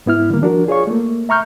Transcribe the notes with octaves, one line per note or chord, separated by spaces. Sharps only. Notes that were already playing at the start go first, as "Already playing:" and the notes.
G#2 B3 E4 F6
D3 D#3 G3 A#3
F3 D4 F#4 A#4
F4 G#4 C#5 D5 F5 C#6
A3 A#3
E5 A#5 C#6 F6 G6